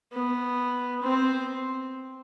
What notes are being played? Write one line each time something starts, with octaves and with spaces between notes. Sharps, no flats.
B3
C4